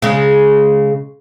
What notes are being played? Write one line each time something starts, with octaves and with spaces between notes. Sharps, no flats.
C#3 G#3